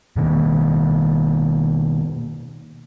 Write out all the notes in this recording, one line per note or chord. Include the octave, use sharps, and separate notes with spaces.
B2 D#3 A#3